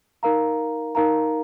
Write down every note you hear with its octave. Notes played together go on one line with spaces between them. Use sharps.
D#4 A#4 F5 A#5
D#4 A#4 F5 A#5